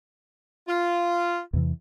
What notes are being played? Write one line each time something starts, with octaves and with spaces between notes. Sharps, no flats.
F4
E2 C3 E3